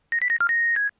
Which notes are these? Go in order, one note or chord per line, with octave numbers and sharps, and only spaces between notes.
A#6
B6
A#6
F6
A#6
G#6